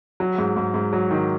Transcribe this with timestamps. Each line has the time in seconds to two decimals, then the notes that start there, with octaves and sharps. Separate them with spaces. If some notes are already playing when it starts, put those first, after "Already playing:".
0.20 F#3
0.38 G#2
0.57 G#2
0.74 G#2
0.93 F#3
1.11 D#3